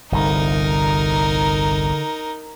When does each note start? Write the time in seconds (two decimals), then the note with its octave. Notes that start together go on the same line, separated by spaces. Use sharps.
0.12 G1 C2 D3 D#4 A#4